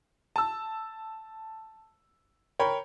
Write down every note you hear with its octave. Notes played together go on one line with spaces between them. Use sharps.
A5 E6
A#4 C#5 G5 B5